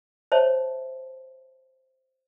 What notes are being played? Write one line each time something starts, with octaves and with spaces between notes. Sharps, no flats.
C5 C#5 E5 A5